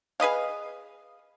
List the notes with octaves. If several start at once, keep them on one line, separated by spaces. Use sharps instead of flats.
G#4 B4 D#5 F5